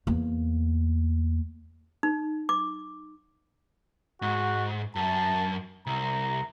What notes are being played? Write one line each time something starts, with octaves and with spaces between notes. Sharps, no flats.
E2 A#3
D#4
D6
G#2 F#4
F#2 A5
C2 A#5